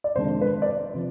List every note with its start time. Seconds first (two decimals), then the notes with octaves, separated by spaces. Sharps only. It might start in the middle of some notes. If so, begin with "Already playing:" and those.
0.04 D5
0.16 F2 C3 D#3 G#3 D4 C5
0.41 B4
0.62 D5
0.66 C5
0.94 C3 F3